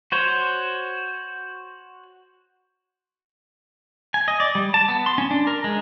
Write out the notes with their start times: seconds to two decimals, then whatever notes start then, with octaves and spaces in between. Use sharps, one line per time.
0.12 F#4 C5 C#5
4.14 G#5
4.28 D#5
4.40 D5
4.55 G3
4.74 A5
4.88 B3
5.06 C6
5.18 C#4
5.31 D4
5.47 A#4
5.64 G#3